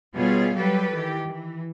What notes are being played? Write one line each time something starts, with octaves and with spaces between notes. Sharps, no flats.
B2 G3 F4 G#4 C#5 F5
F#3 G3 G4 A4 B4
D#3 E3 G4
E3